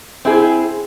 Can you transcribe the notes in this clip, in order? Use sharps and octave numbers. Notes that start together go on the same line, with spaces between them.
C4 E4 G#4